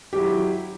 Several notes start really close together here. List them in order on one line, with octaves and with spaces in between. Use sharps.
G4 F#3 E4